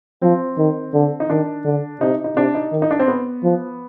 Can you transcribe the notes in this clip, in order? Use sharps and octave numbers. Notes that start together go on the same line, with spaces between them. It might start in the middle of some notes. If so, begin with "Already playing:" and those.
F3 C4
D#3
D3
D#4
D#3 D4
D3
C3 D#4
D#4
C3 D4
D#4
D#3
D#4
D4
C4
B3
F3